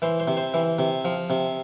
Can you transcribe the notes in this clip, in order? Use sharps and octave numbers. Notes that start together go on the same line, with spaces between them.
E3 C5
C5
C3
C5
E3
C3
F3
C3